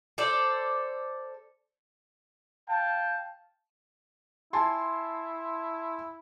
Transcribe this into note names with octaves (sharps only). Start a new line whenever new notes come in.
A4 C5 D5
F5 G5 A5
E4 G#5 A5 C6